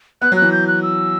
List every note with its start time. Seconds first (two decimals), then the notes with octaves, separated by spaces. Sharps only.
0.22 B3 F#6
0.32 F#3
0.36 F#6
0.42 E3
0.52 G6
0.67 F#6
0.82 E6